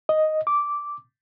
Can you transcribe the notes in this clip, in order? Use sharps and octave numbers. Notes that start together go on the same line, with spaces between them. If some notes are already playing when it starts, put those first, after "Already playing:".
D#5
D6